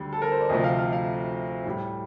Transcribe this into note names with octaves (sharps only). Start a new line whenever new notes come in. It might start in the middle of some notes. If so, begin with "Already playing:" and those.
Already playing: D2 D3 G3
A4
A#4
C5
D5
D2 C3 F3 A3 D#5
F5
F5
F5
A2 G3